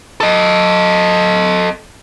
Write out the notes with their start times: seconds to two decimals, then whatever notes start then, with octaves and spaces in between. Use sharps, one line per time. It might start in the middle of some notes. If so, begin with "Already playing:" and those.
0.20 A4 D#5